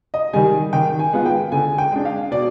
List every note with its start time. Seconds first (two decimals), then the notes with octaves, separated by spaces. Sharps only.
0.14 D#5
0.33 D#3 G3 G#5
0.73 D#3 G5
0.99 G#5
1.13 G#3 B3 F4
1.26 G5
1.52 D3 G#5
1.78 G5
1.92 G#3 D4
2.05 F5
2.31 B2 D5